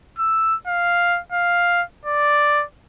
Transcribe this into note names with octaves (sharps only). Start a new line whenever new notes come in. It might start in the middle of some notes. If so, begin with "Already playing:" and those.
E6
F5
F5
D5